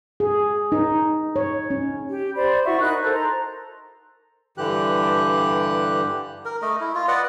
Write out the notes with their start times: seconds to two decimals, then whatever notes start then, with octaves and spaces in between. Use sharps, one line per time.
0.20 G#4
0.72 D#4
1.36 C#5
1.70 C#4
2.08 G4
2.35 C5 D5 B5
2.65 E4 F#4 E5 C#6
2.80 D#4 A#4 B5 F#6
3.01 A4 A#4 C5
3.14 A#5 C6
4.58 G2 D3 E3 G4 F#6
6.45 A#4
6.62 A3 D#5
6.81 E4
6.95 F4
7.08 B4 D5 D#5 F#5